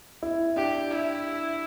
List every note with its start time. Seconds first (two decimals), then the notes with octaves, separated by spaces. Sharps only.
0.23 E4
0.56 D4 G4
0.90 E4